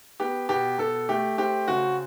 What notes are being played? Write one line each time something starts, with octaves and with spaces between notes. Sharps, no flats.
B3 G4
B2 G4
B2 A4
A3 G4
C4 G4
C#3 F#4